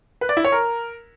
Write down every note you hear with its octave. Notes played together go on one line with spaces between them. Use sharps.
B4
D5
E4
C#5
A#4